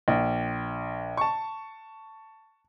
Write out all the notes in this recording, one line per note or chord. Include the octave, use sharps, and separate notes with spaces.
A#1
A5 C#6